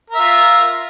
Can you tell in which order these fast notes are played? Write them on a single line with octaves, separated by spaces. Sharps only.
A#4 E5 F4